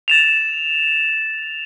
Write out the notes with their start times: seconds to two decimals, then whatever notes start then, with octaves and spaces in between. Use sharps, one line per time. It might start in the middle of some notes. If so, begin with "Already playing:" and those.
0.08 A6 E7 F7